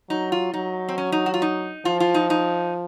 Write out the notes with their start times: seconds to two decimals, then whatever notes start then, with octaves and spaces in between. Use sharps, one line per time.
0.10 F#3 D#4
0.32 F4
0.54 F#3 D#4
0.89 C4
0.98 C#4
1.12 D#4
1.26 F#4
1.34 F4
1.42 D#4
1.85 F3 F4
2.00 F4
2.14 D#4
2.30 D#4